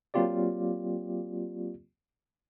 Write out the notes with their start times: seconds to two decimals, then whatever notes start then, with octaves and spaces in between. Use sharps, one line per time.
0.14 F#3 A#3 C4 F4 G4 D5